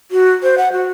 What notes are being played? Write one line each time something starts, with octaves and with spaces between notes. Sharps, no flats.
F#4
C5
F#5
F#4